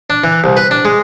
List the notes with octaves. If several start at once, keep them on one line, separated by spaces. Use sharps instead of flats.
D4
E3
C2
B4
D4
G#3